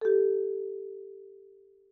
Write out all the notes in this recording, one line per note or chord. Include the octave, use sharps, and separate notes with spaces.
G4 A4